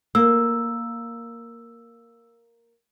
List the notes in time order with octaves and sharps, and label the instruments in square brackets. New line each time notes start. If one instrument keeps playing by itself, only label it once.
[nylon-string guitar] A#3 [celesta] E6